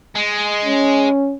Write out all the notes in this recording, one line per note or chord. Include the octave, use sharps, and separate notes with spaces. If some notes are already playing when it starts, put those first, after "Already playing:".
G#3
C#4